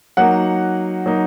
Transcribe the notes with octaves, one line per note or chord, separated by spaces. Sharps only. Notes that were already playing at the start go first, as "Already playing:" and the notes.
F#3 A#3 D#4 F#5
F#3 A#3 D#4